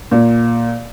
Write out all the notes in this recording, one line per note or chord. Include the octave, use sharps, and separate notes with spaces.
A#2